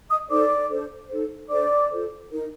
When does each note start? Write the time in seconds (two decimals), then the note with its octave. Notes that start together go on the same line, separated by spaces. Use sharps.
0.09 D#5 D#6
0.29 D#4 A4 C5 D5 D6
0.70 D4 A4 C5
1.09 D#4 A4 C5
1.49 D4 A4 C5 D5 D6
1.90 F4 A4 C5
2.30 D#4 A#4